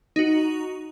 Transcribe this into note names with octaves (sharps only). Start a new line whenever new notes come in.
D#4 F#4